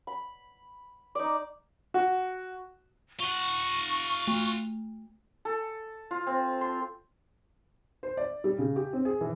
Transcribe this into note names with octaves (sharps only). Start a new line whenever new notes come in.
B5
D#4 D5
F#4
F4 F#5 C#6
A3
A4
F4
C4
C6
C5
D5
G3
C#3
G4
C4
G#4
E3